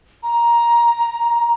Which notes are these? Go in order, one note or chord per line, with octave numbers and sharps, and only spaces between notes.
A#5